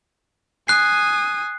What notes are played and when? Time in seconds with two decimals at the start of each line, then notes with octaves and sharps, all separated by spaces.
0.68 G#5 D#6 F#6 C7